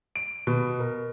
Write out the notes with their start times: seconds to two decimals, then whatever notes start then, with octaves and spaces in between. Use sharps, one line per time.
0.16 D7
0.47 B2
0.80 A#4